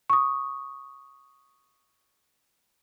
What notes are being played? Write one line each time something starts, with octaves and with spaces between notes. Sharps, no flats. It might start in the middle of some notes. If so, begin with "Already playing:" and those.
C#6 D#6